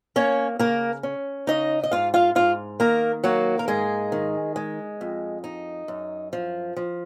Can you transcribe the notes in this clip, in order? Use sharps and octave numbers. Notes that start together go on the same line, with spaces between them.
A#3 C#4 C#5
C#3 A#3 A#4
C#4
C#3 D#4 D#5
D#5
G#2 F4 F5
F4 F5
G#2 F4 F5
D#3 A#3 A#4
F#3 A#3 F#4
A#4
G#2 G#3 G#4
D#3
G#3
F2
D#4
F#2
F3
F3